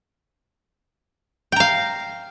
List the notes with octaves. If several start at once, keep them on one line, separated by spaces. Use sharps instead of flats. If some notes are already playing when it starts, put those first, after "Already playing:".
F5 G5 A#5